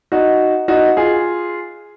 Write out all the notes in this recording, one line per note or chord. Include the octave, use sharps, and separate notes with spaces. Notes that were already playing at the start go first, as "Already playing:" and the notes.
D#4 F#4
D#4 F#4
F4 G#4